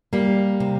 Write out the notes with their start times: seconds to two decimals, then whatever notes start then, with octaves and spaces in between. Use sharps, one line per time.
0.13 G3 A#3
0.60 C3